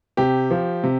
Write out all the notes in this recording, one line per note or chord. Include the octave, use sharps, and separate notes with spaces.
C3 G4
F3
C3